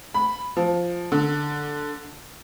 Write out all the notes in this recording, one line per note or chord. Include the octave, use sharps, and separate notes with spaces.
B5
F3
D3